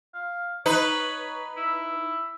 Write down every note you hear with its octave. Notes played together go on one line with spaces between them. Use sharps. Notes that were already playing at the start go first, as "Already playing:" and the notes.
F5
D#4 B4 C#5
E4